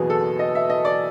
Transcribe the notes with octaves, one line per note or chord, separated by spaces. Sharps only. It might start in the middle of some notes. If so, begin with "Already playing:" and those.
Already playing: F#1 E2 B2 F#3 B3 G#4
A4
D#5
E5
D#5
D5